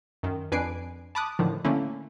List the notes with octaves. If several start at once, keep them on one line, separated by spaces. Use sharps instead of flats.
F#2 D#3
F2 D4 B4 G#5 C7 D7
A5 B5 D6 D#6 F#6
A2 D3 D#3 F3
D3 A3 A#3 C#4 E4